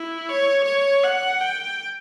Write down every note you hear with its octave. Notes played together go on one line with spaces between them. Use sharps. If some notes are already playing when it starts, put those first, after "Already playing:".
Already playing: E4
C#5
C#5
F#5
G5